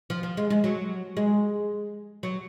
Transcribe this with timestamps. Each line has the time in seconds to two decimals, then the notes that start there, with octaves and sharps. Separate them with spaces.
0.10 F3
0.23 F3
0.37 G#3
0.50 G#3
0.64 F#3
1.17 G#3
2.23 F#3